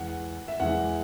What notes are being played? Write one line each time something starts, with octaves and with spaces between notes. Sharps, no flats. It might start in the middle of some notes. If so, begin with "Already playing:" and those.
Already playing: E2 E3 G#3 F#5
E5
E2 E3 G#3 F#5